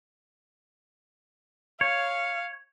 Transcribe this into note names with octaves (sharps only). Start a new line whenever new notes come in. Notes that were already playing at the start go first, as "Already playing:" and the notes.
C#5 F5